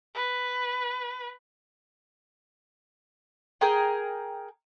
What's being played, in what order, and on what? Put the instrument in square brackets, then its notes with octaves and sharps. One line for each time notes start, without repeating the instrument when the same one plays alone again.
[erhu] B4
[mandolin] G#4 A#4 G5